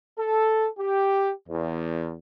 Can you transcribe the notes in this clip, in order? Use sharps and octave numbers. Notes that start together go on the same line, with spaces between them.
A4
G4
E2